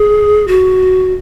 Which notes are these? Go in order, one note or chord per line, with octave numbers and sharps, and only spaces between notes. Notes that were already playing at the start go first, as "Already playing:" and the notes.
Already playing: G#4
F#4